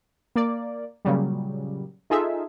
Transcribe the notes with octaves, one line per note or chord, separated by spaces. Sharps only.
A#3 D5
A#2 C#3 F#3 G3
D#4 F4 G#4 A4 E5